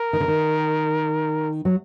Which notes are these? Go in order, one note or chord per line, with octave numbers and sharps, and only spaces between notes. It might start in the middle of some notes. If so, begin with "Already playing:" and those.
Already playing: A#4
D#3
D3
D#3
F#3